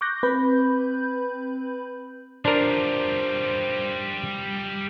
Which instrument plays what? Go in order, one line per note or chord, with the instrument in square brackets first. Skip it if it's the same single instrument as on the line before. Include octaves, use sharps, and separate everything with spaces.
[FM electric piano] C#6 D6 F#6 G6 A#6
C4 B4 B5 G6
[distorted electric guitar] G3 F4 [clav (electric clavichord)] D4 A#4 [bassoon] C5